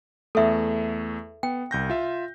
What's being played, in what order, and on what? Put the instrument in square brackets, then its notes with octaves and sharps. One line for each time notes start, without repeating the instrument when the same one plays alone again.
[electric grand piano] E2 A3 [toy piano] A4 E5
[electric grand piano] B3 [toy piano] G5
[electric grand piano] C2 G6 A#6
F4 E5